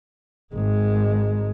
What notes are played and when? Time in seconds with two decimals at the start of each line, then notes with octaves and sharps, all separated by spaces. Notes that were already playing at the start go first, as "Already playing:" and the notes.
0.54 G#1 G#3